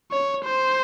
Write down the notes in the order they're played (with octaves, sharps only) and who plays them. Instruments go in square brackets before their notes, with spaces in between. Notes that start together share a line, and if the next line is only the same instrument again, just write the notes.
[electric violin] C#5
C5